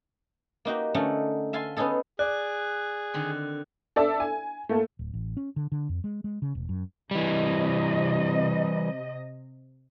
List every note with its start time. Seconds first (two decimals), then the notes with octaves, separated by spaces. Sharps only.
0.65 A#3 D#4 F#4 G4
0.94 D3 A3 C#4 D#4 F#5
1.53 E5 F5 G#5 A5 C6
1.77 B3 C#4 D#4 G#4 A4
2.19 G#4 D5 F#6
3.14 D3 D#3 C4
3.96 A4 D5 E5 E6
4.20 G#5
4.69 A3 A#3 A4
4.99 D1
5.14 A1
5.37 C#4
5.56 D3
5.72 D3
5.89 F2
6.04 G#3
6.24 G#3
6.42 C#3
6.55 E1
6.69 F#2
7.11 C3 E3 G3 D#5